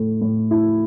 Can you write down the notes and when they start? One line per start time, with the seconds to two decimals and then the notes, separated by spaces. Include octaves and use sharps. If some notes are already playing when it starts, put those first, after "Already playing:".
Already playing: A2 A3 A4
0.21 A2
0.51 E4